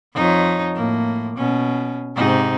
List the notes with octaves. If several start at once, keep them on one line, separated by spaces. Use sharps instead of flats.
F2 D#4 C#5
A2 A#3
B2 C#4
G#2 C3 D#4